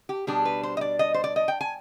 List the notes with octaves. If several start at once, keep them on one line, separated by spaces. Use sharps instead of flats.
G4
B2 G3 D4 G#4
B4
C5
D#5
D5
D#5
C5
D5
D#5
G5
G#5